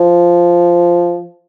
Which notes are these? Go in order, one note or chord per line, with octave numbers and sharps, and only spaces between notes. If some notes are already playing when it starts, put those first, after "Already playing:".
Already playing: F3